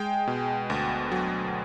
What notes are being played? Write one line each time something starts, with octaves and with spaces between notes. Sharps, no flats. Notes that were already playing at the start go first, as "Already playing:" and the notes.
Already playing: G#3 G5
B2
D2
F#3